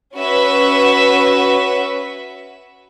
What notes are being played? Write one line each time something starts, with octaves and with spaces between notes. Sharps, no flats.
C#4 F#4 B4 E5